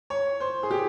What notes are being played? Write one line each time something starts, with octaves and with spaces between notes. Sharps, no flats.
C#5
C5
G#4
G4